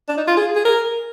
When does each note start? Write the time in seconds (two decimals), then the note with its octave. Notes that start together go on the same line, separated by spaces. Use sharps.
0.09 D4
0.17 D#4
0.27 F4
0.37 G#4
0.55 G#4
0.65 A#4